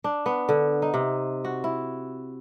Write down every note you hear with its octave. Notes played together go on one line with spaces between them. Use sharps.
D4
B3
D3
D#4
C3
F#4
E4